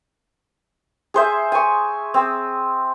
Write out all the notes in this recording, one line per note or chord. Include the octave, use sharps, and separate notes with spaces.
G#4 C5 E5
G#5 C#6
C4